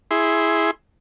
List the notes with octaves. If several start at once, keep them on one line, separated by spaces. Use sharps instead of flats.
E4 G#4 C6